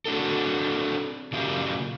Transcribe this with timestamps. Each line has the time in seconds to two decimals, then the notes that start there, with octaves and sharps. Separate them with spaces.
0.06 C4 D4 F#4 A4
1.32 A#2 C#3 F4 G4